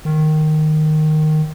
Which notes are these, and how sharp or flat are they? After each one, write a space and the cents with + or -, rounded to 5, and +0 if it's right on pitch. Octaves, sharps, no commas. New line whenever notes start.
D#3 -10